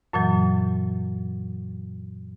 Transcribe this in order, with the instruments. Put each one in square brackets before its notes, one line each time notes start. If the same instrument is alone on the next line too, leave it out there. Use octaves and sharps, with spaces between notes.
[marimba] F#2 A#2 E3 F#3